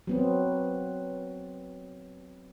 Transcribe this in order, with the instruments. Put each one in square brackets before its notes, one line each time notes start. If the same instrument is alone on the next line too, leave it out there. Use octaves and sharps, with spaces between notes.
[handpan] F#3 B3 C4